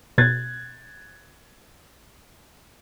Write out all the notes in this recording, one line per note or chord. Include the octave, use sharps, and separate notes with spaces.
B2 F#6 G#6 A6